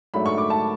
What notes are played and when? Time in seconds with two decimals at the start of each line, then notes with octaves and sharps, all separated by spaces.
0.14 G#2 F#3 A3 D4 B5
0.26 C#6
0.38 D6
0.50 A5